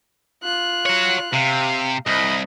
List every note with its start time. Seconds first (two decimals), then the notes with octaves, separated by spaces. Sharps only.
0.44 F4 F#6
0.86 F#4 C#5
1.33 C3 F5
2.07 C2 D#5 B5